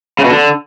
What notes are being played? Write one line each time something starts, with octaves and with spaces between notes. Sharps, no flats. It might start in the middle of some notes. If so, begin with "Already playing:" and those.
C#3
B2
D3